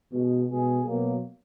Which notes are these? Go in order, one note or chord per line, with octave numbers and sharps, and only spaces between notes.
B2 G#3
B2 G#3 G#4
B2 F#3 A#3